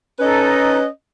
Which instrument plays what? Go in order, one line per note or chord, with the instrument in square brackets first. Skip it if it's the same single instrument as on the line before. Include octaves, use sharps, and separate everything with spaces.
[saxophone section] C#4 B4 D#5 [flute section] D#4 A4